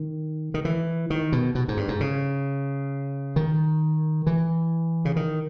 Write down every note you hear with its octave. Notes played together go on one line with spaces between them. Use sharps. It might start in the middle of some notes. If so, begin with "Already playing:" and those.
Already playing: D#3
D#3
E3
D#3
B2
B2
G#2
G2
G#2
C#3
D#3
E3
C#3
D#3